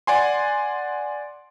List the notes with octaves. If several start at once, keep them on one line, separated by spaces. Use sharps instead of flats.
D5 F#5 G#5 C6